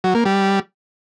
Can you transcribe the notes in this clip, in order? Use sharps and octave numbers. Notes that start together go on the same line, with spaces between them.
F#3
A#3
G3